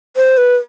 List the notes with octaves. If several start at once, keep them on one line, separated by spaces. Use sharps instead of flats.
C5
B4